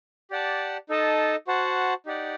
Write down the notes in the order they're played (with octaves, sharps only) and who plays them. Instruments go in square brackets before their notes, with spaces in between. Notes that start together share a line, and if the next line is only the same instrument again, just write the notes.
[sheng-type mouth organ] G4 D5 F#5 A5
D#4 A4 D#5 A5
F#4 C5 F#5 A5
D#4 G4 D5 F#5